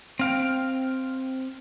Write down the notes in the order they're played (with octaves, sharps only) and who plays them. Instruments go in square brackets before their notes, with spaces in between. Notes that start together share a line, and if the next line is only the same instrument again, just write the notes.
[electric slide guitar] C4 F5 G5